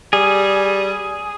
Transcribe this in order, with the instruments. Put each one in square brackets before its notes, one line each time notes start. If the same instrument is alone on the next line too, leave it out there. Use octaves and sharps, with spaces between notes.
[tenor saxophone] G3 [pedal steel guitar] G#4